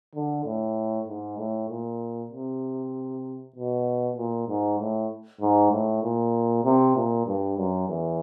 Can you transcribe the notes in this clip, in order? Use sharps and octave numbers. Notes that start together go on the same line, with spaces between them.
D3
A2
G#2
A2
A#2
C3
B2
A#2
G#2
A2
G#2
A2
A#2
C3
A#2
G2
F#2
E2